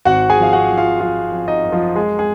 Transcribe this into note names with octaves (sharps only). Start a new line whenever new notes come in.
G#1 F#4 F#5
G#4 G#5
F3 F5
F#4 F#5
F3
F4 F5
F3 F4 F5
F3
D#4 D#5
F#2
F3 F4
G#3 G#4
G#3 G#4